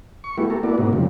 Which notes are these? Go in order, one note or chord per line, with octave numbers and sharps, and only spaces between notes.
C#6
G#3 A3 B3 E4 F#4 G4
G4 A4 A#4
A#3 B3 E4 F#4 D5
G#2 C3 A#3 D#4 F#4
F#2 C#3 F3 G3